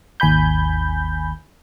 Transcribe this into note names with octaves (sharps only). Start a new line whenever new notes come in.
G#1 D#2 G#5 B5 G6